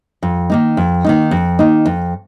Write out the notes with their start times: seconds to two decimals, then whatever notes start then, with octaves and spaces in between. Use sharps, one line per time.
0.22 F2
0.50 D#3 A#3 D#4
0.77 F2
1.04 D#3 A#3 D#4
1.31 F2
1.59 D#3 A#3 D#4
1.86 F2